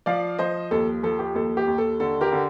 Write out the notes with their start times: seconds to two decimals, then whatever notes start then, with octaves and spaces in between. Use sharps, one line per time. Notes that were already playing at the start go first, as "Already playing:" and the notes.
0.06 F3 D5 F5
0.39 F3 C5 D#5
0.71 D#2 A4
1.03 F3 A4
1.19 G4
1.35 D#2 A4
1.57 G4
1.67 D#2
1.78 A4
2.00 D3 A4
2.21 G4 A#4
2.32 D3